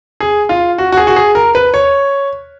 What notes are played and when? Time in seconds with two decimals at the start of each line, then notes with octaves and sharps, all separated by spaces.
0.20 G#4
0.49 F4
0.78 F#4
0.92 F#4
0.97 G#4
1.07 F#4
1.16 G#4
1.35 A#4
1.55 B4
1.74 C#5